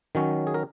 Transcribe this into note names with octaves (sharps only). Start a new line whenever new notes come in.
D#3 F#3 C#4
G#4
A#4